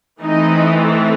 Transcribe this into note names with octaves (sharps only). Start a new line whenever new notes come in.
E3 A3 C4 D#4